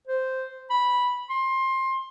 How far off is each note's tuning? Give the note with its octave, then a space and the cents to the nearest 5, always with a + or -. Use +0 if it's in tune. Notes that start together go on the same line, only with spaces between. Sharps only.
C5 -5
B5 -10
C6 +20